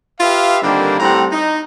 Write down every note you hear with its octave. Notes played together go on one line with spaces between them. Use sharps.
F4 G4 B4 E5 F5
D3 D#3 G3 A#3 C4 D4
A2 G3 C4 F#5 A#5
D#4